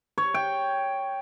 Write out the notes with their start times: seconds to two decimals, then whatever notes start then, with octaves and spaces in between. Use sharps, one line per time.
0.18 C#5
0.34 G5